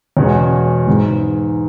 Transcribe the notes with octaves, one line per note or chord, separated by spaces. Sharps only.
E2 B2 G#3 C#4 F#4
G#2 E3 G#3